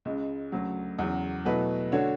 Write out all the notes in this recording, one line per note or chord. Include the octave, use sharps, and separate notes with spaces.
C#2 C#3 G#3
D2 C#3 F#3
E2 C#3 F#3
B2 F#3 A3 E4 B4
D3 A3 D4 F#4 C#5